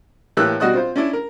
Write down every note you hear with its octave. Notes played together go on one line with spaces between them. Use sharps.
A2 E3 A#3 G4 E6 F#6
B2 G3 F#4 D#5 D#6 F#6
C4 F4 C5
C#4 D4 E4
A#4